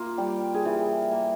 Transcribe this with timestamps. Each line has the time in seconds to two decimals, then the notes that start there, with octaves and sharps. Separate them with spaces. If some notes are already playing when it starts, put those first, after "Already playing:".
Already playing: A#3 F4
0.18 G3 G4
0.54 G#4
0.65 E3 G4
1.11 A#3